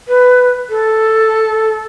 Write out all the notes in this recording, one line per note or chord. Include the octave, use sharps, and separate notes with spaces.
B4
A4